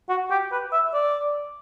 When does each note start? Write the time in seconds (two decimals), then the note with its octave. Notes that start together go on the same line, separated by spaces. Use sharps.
0.09 F#4
0.31 G4
0.52 B4
0.73 E5
0.94 D5